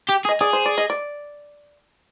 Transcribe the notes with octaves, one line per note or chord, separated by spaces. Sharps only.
G4
G#4
D#5
G#4 D5
C5
D5
D#5
D5